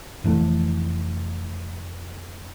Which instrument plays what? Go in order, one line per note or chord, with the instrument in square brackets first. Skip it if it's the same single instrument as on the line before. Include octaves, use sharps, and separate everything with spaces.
[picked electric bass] F1 E3 A3